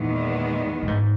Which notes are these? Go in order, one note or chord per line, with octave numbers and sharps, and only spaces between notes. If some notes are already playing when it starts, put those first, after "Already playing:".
Already playing: E2 A#2 D#3 G#3 B3
A#2
G#2